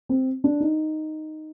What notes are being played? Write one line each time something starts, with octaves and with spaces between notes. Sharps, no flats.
C4
D4
D#4